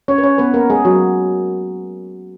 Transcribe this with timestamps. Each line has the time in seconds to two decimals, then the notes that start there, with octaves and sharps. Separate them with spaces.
0.08 C#4 C#5
0.18 B4
0.23 C#4 C#5
0.38 B3 B4
0.54 A#3 A#4
0.70 G#3 G#4
0.85 F#3 F#4